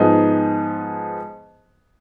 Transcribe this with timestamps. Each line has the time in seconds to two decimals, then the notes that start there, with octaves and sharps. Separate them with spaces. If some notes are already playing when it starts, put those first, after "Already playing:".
Already playing: G#2 F3 B3 D#4 G#4